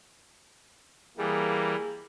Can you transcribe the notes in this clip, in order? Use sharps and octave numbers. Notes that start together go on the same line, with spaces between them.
E3 G3 A#3 G#4